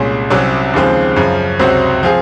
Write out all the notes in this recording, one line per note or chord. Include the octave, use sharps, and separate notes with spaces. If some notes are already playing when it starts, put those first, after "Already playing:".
Already playing: C2 A#2 G#3 C#4
C2 C3 F#3 C#4
D#2 C#3 F3 G#3 C4
F#2 C#3 F3
C#2 C3 F#3 C4 F#4
F3 C4 F4 G#4